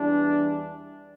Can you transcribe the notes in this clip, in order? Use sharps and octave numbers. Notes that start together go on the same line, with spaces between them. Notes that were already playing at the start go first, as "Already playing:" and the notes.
Already playing: E2 E3 G3 D4